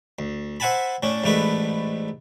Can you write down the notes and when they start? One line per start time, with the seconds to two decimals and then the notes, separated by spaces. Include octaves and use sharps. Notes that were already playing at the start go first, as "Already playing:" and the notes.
0.19 D2
0.60 C5 E5 F#5 G#5 A5 B5
1.03 A2 C#4 D4
1.24 A1 G#2 A3 D4 E4 B4